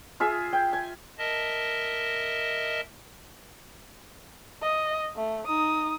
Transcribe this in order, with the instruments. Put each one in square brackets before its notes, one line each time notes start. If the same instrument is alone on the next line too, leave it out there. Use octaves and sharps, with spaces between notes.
[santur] F4 G#4 E5
G5
G#5
[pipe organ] A#4 D#5 E5 A5
[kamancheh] D#5
A3
D#4 D#6